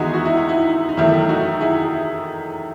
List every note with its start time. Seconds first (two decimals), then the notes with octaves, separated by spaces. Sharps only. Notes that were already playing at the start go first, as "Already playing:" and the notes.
Already playing: E2 D#3 G#3 B3 D#4 E4 F#4 G#4
0.14 F#4
0.25 E4
0.37 D#4
0.49 E4
0.89 D#4
0.97 E2 D#3 F#3 A3 E4
1.29 D#4 F#4
1.61 E4 G#4